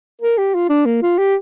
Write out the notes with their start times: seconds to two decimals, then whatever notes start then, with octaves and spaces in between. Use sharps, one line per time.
0.21 A#4
0.38 G4
0.54 F4
0.69 D4
0.86 A#3
1.02 F4
1.18 G4